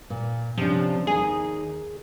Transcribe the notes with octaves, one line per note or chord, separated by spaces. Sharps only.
A#2
C3 F3 C#4 D4
D#2 D#4 G#4 G#5